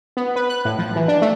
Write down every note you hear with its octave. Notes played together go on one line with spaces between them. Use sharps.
B3
B4
F#6
A2
F3
E3
D4
A3